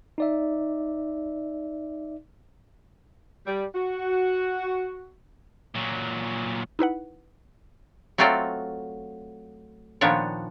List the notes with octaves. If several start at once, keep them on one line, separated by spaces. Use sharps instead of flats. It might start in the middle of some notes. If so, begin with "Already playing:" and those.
D#4 D5 E5
G3
F#4
A#2 F#3
D#4 E4 B4 F#5
F#3 A3 C4 F4 A4 D5
A#2 D#3 F3 B3 D4 C#5